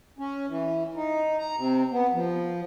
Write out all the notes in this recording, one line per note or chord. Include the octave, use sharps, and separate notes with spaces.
C#4
E3
D#4
A#5
C3
B3
F3